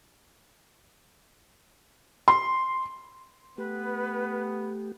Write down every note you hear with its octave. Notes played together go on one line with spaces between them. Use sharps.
C6
A3 B3 G4 B4